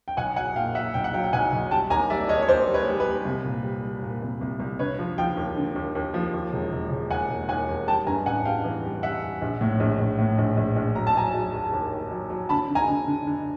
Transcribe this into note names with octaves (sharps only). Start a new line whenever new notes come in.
G5
B1 F#5 G#5
F#3 F#5 G#5
A#2 F5 G5
F#3 E5 F#5
B1 G5
F#5
F#3 F5 G5
G5
B1 F#5 G#5
B1
G3 G5 A5
D#2 G#5 A#5
G3 D5 E5
D#2 C#5 D#5
C#5
D#2 C5 D5
G3
B4 C#5
G3
B4
G3
C2
A#2
G3
G3
A#2
C2
C2
C2
D3 B4 C#5
F3
F3 F5 G5
D#2
D3
D#2
D#2
F3
D#2
E1
E1
E1
D#2 F#5 G#5
E1
D#2 F#5 G#5
D#2
G3 G5 A5
G2 G#5 A#5
A1 F#5 G#5
G3 F5 G5
E3
G3
G3 E5 F#5
G3
A#1
A2
A#1
A#1
A2
A#1
A#1
A#1
F#3 A#5
A5
F#3 G#5 A#5
F#3
D#2
D#2
D#3
F#3
F#3
D3 A5 B5
D3
G#5 A#5
D3
D3
D3